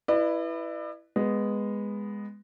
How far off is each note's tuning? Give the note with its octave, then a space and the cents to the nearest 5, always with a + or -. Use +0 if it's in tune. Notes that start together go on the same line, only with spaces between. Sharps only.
E4 +5 B4 +0 D5 +45
G#3 -10 B3 +0